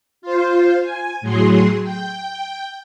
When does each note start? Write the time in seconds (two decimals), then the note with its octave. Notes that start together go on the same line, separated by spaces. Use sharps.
0.22 F4 C5
0.82 G#5
1.21 A2 F#3 G#4 C6
1.82 G5